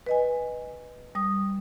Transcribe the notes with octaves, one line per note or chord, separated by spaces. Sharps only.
B4 D#5 G#5
G3 D#6